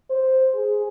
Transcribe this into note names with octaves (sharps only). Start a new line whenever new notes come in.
C5
G#4